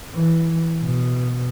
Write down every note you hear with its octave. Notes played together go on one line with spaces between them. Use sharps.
E3
B2